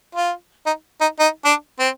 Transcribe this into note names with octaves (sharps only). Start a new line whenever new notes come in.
F4
D#4
D#4
D#4
D4
C4